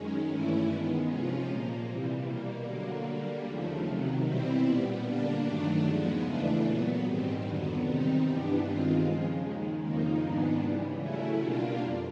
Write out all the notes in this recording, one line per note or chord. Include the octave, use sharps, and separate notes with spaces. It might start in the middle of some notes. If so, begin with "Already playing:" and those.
Already playing: F#2 D#3 G#3 C#4
G2 E3 A3 C#4 E4
D#3 G#3 B3
C3 F3 G#3 C#4 F4
A#2 F3 A#3
C3 E3 G3
B2 G3 A#3
D3 F#3 A#3
D3 G3 A#3
D#2 C#3 F3 A3
C3 D#3 F#3
B2 G3 C4 E4
A#2 G3 B3
D3 G3 A#3 D4
G2 D#3 F#3 A3 D4
D#2 C#3 F3 G#3 B3
E2 C#3 E3 A3 D4
A#2 F#3 B3
G#2 D#3 G3 C4
F2 D3 F#3 B3
C3 D#3 G3 C4 D#4
G2 E3 G3 B3 D4
G2 D#3 G#3 C4 F4
C#3 F3 G#3
D#2 D#3 G#3
F2 C#3 F3 A#3 D#4
G#2 D#3 G#3 B3 D4
C#3 E3 G3
C#3 F#3 A3 C#4 E4
B2 G3 A#3 D4 F4
F2